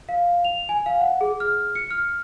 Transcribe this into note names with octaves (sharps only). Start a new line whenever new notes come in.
F5
F7
G#5
F5
F#5
G#4
F6
C#7
F6